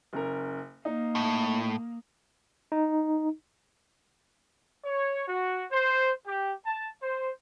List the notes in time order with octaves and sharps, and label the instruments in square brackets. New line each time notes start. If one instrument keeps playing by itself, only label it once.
[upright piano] F#1 C#3 A#4
[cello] A#3 [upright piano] D#4
[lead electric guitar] A2
[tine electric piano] D#4
[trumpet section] C#5
F#4
C5
G4
A5
C5